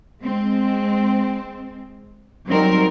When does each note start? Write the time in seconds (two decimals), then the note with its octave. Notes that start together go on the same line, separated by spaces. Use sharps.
0.23 G#3 C4
2.48 F#3 G3 C4 D#4 A#4